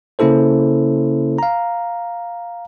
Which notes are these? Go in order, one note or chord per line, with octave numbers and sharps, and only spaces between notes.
C#3 A#3 C#4 E4 A4 C5
F5 A#5